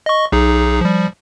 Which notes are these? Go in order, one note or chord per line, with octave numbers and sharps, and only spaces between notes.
D#5 C#6
B1 D#4 G#4
F3 G3